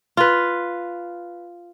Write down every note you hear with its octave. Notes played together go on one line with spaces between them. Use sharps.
F4 B4